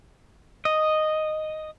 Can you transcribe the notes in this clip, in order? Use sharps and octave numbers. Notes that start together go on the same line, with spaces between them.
D#5